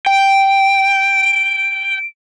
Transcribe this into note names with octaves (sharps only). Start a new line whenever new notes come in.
G5 D7